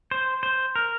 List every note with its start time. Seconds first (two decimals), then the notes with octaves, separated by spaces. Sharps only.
0.11 C5
0.43 C5
0.76 A#4